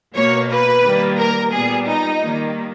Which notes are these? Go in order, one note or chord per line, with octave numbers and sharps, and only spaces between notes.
B2 A#3 C#5
B4
D#3 G3 A#3
A#4
A#2 G3 B3 G#4
D#4
D#3 G3 A#3